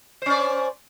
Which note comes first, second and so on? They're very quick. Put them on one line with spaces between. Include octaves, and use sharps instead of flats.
C5 C#4 D5